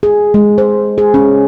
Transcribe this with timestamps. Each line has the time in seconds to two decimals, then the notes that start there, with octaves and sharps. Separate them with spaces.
0.03 G#4
0.34 G#3
0.58 C5
0.98 G#4
1.14 C#4